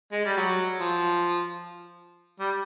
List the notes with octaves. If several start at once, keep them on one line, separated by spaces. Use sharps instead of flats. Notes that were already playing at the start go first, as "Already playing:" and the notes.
G#3
G3
F#3
F3
G3